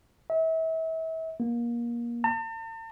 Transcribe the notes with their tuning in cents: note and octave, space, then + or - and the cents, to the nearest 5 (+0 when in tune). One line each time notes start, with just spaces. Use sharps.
E5 -35
A#3 +25
A5 +45